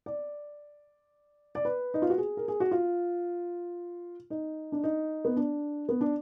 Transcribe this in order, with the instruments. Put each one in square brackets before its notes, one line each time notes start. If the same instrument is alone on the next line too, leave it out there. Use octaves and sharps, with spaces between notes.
[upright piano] D5
D5
B4
D#4
F4
F#4
G#4
A#4
G#4
F#4
F4
D#4
D4
D#4
B3
D4
B3
D4